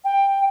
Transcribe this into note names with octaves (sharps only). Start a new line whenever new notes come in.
G5